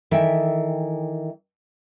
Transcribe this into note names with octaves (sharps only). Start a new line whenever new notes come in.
D#3 E3 A4 E5 G5